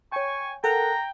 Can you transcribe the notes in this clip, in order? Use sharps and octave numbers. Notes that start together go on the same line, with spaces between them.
C#5 G5 G#5 C#6
A4 A#4 F#5 G5 A#5